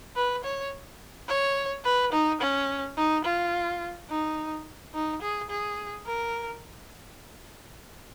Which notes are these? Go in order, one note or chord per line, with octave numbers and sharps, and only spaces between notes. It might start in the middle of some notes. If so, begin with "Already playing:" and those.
B4
C#5
C#5
B4
D#4
C#4
D#4
F4
D#4
D#4
G#4
G#4
A#4